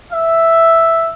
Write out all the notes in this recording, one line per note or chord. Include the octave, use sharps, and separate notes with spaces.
E5